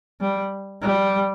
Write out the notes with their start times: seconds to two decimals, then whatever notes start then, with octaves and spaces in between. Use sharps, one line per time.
0.21 G3
0.81 G3